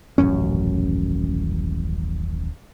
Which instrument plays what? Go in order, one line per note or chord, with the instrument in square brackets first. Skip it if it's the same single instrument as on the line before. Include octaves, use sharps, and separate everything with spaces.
[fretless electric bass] D#1 A1 F#2 C#4